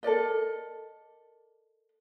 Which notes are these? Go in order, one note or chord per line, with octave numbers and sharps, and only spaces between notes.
A4 A#4 D5 D#5